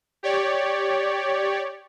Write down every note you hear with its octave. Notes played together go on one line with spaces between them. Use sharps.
G4 C#5 D5